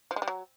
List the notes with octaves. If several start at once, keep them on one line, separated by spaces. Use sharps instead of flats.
F3
G#3
G3
F#3